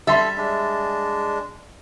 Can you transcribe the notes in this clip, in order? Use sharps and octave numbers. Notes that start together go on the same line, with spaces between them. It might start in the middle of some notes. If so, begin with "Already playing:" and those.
G3 A4 E5 C6
G#3 D4